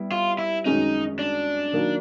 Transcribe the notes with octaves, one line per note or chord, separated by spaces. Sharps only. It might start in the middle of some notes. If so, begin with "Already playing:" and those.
Already playing: G3 B3 E4
F4
E4
F#2 D#3 G#3 C#4 D#4
D4
D#3 F#3 A#3